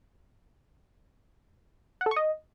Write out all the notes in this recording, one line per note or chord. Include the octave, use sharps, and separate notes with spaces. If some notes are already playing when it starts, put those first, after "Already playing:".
F#5
A4
C#6
D#5